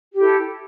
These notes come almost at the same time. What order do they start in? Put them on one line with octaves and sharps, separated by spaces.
G4 E4 A4